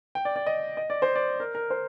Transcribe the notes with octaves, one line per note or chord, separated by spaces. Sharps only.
G5
D5
D5
D#5
D#5
D5
C5
D5
A#4
A#4
C5